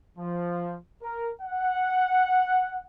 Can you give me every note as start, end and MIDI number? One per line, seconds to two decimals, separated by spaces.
0.18 0.76 53
1.03 1.29 70
1.42 2.87 78